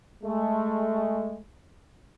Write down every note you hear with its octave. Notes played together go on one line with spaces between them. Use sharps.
G#3 A3